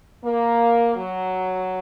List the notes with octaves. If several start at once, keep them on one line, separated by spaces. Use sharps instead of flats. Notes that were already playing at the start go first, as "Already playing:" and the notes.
A#3
F#3